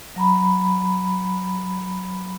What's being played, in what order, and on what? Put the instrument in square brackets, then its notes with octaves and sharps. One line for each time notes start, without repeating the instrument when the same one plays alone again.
[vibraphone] F#3 A#5 B5